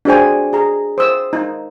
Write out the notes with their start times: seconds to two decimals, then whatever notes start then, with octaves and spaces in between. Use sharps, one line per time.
0.05 D4 F#4 G#4 C5 G5 G#5
0.53 G#4 A#5
0.98 C5 D#6 E6
1.33 D#4